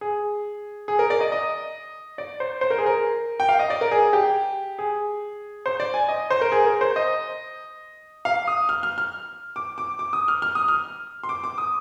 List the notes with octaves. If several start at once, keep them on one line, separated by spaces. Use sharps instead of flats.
G#4
G#4
A#4
D5
D#5
D#5
D5
C5
C5
A#4
G#4
A#4
G5
F5
D#5
D5
A#4
G#4
G4
G#4
C5
D5
G#5
D#5
C5
A#4
G#4
A#4
C5
D#5
F5
D#6
F6
F6
F6
D6
D6
D6
D#6
F6
F6
D#6
F6
C6
D6
D6
D#6